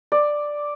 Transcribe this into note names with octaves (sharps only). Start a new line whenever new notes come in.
D5